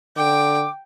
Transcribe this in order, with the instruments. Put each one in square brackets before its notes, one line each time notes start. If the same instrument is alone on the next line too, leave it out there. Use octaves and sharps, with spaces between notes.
[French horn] D3 [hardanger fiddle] G5 [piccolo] D6